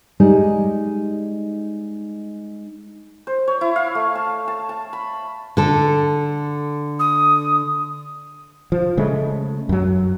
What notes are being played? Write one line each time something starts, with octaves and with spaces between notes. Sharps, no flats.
G3 G#3 D#4 C#5 D5
C5
C#5
E4
F5
A3
A5
A5
A5
B5
D3 A4
D#6
F3
C#3 G#3 A3
F#2 F#3